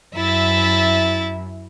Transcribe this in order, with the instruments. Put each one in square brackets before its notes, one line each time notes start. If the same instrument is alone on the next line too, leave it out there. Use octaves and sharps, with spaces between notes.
[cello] F#2 [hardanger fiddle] E4 [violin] E5 A6